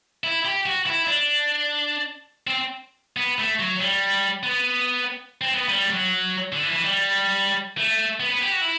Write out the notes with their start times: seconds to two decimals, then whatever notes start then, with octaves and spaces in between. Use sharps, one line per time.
0.24 E4
0.45 G4
0.66 F#4
0.87 E4
1.08 D4
2.47 C4
3.17 B3
3.39 A3
3.59 F#3
3.81 G3
4.43 B3
5.41 C4
5.54 B3
5.69 G3
5.90 F#3
6.52 D3
6.63 E3
6.73 E3
6.84 G3
7.78 A3
8.20 B3
8.31 B3
8.42 G4
8.52 F#4
8.61 E4